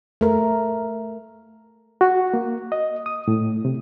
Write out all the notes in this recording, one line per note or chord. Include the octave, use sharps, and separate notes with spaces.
A3 A#4
F#4
A#3
D#5
D#6
A2
C3